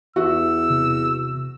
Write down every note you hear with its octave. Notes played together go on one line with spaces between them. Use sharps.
E2 F#4 E5 E6
C3